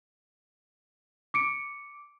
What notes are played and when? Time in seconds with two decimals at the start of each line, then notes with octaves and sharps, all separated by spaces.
1.34 D6 C#7 D7